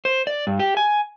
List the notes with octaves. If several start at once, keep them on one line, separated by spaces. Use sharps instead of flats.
C5
D5
G2
G4
G#5